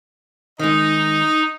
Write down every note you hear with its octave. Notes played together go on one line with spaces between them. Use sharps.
D#3 G#3 D#4 D#5